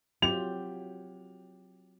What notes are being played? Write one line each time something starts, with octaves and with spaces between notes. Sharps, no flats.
F#3 C4 F4 G4 F7